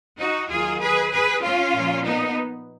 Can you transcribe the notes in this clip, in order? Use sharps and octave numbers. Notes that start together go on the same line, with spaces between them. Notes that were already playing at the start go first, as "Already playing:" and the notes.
D#4 F#4
D#2 D#3 F#3 F4 G#4
G#4 B4
G#4 B4
C#4 F4
A#2 F3
B3 D#4